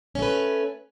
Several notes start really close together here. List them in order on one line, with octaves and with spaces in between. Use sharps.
C#4 A3 B4